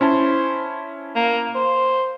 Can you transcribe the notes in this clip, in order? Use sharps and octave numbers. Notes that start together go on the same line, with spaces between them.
C#4 E4 C5 A5
A#3
C5